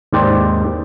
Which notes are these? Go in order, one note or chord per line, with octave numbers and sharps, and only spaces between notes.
D#2 G#2 G4 C5 D5